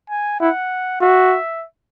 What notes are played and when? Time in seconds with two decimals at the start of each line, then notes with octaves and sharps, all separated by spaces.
0.10 G#5
0.40 E4 F#5
1.01 F#4 E5